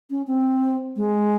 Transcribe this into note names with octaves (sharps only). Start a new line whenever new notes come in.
C#4
C4
G#3